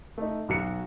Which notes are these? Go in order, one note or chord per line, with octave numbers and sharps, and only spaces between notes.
A3 D#4
B1 F#4 C#7